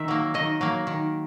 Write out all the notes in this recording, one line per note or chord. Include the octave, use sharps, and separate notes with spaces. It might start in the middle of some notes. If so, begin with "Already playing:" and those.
Already playing: D#3 E5
F#3 A#3
D#3 D#5
F#3 A#3
D#3